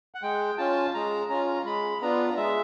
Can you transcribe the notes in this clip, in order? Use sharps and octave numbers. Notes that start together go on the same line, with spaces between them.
F#5
G#3 G5
C#4 F4 A5
G#3 A#5
C#4 F4 A#5
G#3 B5
B3 D4 F4 A#5
G#3 E5